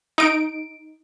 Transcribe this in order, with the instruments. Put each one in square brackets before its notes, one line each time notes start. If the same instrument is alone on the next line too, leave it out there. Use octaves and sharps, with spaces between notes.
[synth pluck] D#4 D7